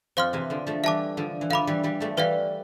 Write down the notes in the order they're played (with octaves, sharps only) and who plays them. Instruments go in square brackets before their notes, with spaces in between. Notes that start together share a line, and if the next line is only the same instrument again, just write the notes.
[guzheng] F2 [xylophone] C5 F5 C6 F6
[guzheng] C3 E3
D3 F3
F3 A3
[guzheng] E3 G3 [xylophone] E5 A5 D6
[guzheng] D3 F3
E3
[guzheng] D3 F3 [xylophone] F5 B5 D6
[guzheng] E3 G3
E3 G3
F3 A3
[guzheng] E3 G3 [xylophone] B4 D5 F5